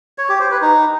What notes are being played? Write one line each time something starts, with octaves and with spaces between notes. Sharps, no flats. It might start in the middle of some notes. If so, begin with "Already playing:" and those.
C#5
G4
C5
B4
D#4